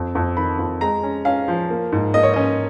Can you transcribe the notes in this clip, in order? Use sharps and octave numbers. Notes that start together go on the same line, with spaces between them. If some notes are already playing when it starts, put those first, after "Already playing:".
Already playing: F2
F2
D#3 B5
F2
G#3 A#5
C#4
C#4 F5
F3
A#3
G#2
A#3 D#5
C#5
C#4 D#5